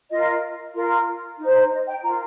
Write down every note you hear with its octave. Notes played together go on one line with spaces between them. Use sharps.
F4 A#4 D#5
F4 A#4
D#4
C5
A#5
D#5
G5
F4 A#4 A#5